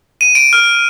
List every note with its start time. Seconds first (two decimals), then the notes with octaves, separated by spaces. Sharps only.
0.21 D#7
0.35 D7
0.53 F6